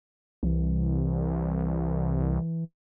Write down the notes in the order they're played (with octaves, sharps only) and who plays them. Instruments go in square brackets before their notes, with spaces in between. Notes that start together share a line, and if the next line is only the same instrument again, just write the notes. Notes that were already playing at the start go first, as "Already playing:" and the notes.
[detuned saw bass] C2 [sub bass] E3